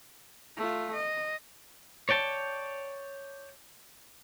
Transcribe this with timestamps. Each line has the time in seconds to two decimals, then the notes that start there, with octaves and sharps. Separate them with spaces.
0.57 A3 F4
0.94 D#5
2.09 C#5 D5 G5 A5